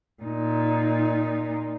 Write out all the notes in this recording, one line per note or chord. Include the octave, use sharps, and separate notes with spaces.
A#2 D#4